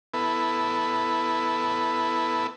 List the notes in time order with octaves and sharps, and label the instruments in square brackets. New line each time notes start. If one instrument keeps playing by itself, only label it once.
[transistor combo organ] B3 E4 A4 B4